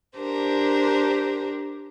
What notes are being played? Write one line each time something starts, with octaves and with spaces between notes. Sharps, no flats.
D4 G4 A#4 C5